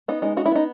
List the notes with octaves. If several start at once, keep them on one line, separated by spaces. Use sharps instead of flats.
B3 D#4
G#3 D#4
D#4 F#4
E4
B3 D#4